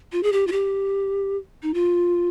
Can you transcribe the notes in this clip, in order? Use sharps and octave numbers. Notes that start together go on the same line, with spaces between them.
F4
G#4
G4
F4
G4
D#4
F4